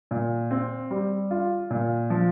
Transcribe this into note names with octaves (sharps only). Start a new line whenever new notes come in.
A#2
C4
G3
F4
A#2
F3